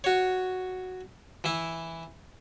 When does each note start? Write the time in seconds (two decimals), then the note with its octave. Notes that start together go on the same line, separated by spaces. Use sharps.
0.04 F#4 C#5
1.44 E3 E4